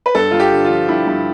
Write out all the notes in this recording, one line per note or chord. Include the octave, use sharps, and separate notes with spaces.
B4
G2 A4
G2 F4
G4
D3
F4
F3
G2 E4
G2